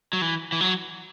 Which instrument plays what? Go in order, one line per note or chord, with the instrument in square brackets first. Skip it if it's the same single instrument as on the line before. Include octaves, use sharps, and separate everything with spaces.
[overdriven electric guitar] F#3
E3
E3
F#3